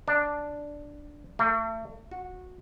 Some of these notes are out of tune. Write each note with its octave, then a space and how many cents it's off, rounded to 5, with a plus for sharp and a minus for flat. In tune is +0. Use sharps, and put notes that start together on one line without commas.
D4 +0
A3 +40
F#4 -15